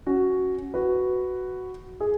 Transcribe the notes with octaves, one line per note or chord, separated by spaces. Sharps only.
C#4 F#4
F#4 B4
G#4